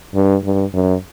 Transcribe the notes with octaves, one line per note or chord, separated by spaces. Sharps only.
G2
G2
F#2